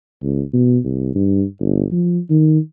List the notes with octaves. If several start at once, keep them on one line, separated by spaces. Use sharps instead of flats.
C#2
B2
C2
G2
G1
F3
D#3